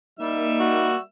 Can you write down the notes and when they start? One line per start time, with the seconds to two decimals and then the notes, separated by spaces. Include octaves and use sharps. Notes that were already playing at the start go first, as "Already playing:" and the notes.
0.20 G3 A#3 D#4 E5 E6
0.60 F#4